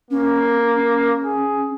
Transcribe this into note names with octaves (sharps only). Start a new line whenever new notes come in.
A#3 C#4
C#4
G#4